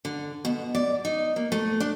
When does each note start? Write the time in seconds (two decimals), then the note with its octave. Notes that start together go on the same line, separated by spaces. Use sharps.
0.05 D3
0.45 B2
0.75 D5
1.05 D#4
1.36 A#3
1.52 A3
1.80 D4